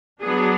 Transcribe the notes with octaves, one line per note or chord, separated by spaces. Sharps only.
F#3 B3 D4 G#4